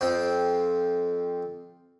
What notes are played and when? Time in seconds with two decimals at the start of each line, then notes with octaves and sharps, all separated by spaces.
0.01 F2 C4 G5